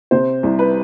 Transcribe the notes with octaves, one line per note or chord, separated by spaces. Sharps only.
C3 C5
C2
B4